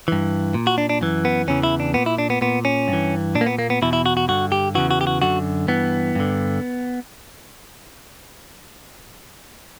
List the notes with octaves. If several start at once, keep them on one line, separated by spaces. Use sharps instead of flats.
G2 E3
A#2
F#4
D4
D4
F#2 E3
B3
E2 C#3 E3 C#4
E4
D4
A#2 B3
E4
D4
B3
A#2 B3
C#4
G2
E3
A#2 D4
A#3
B3
A#3
B3
E2 B2 E4
E4
F#4
F#4
G2 D3 F#4
G4
E2 C#3 E3 F#4
F#4
G4
F#4
F#2 D3 F#4
G2 E3 B3
G2 D3